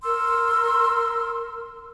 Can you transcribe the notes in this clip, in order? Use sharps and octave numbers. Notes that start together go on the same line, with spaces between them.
A#4 C6 E6